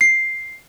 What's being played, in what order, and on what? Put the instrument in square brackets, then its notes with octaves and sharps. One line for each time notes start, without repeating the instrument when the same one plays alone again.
[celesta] C7